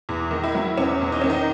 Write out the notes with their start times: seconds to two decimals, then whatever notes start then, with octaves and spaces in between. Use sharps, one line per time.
0.09 E2
0.31 D#3
0.44 E4
0.55 F#3
0.77 E2 C#4
1.02 E2
1.12 D#4
1.22 D#3 C#4
1.30 D#4